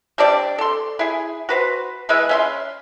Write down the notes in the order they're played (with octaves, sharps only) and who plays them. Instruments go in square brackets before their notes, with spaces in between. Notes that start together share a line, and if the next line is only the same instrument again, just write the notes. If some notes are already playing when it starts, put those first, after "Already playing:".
[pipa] G3 C4 D4 D5
A4 C6
E4 G#4
F#4 B4 C5
E3 G#3 B4 E5
C#4 E5 C6